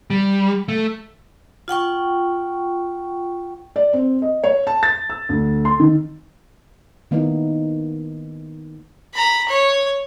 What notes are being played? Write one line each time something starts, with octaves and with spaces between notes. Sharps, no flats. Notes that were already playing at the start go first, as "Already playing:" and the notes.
G3
A3
F4 F#5 G5 C#6
D5
C4
D#5
C#5
A5
A6
E6
D2
C6
D#3
D#3 A#3 B3 D#4 E4
A#5 B5
C#5